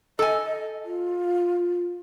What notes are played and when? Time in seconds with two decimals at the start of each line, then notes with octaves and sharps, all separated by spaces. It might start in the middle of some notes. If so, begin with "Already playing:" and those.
0.19 A4 D#5 G#5
0.85 F4